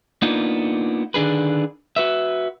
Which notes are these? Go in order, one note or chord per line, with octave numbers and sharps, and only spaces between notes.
A#3 B3 D4 D#4 F4
D3 D#3 D4 G#4 B4
F#4 B4 E5